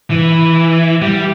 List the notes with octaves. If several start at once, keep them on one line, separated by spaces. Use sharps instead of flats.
E3
G3